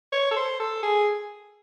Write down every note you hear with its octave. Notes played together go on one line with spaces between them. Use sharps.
C#5
A4
C5
A4
G#4